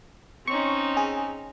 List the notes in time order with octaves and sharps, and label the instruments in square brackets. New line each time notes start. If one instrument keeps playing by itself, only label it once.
[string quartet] C4 C#4 D#4 [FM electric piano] C#6
[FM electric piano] G#4